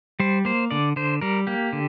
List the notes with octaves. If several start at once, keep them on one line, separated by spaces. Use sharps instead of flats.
G3 C5
A#3 C5
D3 D5
D3 C5
G3 A#4
A#3 G4
D3